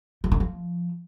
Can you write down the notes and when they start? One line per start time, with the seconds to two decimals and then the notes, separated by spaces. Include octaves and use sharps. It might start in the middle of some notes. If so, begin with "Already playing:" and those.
0.24 F3
0.32 D#3
0.40 F3